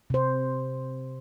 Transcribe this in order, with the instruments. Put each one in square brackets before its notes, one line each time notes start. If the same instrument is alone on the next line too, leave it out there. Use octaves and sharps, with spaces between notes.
[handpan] C3 C5